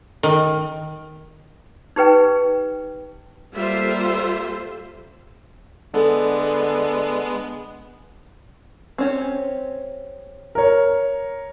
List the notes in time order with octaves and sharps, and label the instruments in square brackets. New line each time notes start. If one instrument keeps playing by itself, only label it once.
[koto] D#3
[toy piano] D#4 G4 B4 G5
[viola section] G3 A#3 F4 A4 C5 E5
[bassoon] D3 [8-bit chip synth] G#3 B3 [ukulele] A4
[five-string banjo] C4 C#4 G4
[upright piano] A#4 C#5